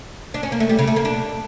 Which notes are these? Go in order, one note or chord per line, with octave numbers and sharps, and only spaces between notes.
D4
C#4
A#3
A3
G3
C#3
A3
A#3
D4